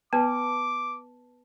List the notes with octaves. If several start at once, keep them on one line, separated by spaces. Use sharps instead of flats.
B3 B4 A5 D6